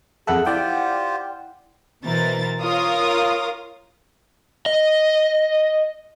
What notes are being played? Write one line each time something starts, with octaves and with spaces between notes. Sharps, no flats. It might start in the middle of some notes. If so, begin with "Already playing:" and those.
F2 G#4 A4 E5 F#5 B5
E4 F4 G4 C5 D5 F#5 G5
B2 E3 A#4 C5 A6
F4 A#4 C#5 F5 D#6
D#5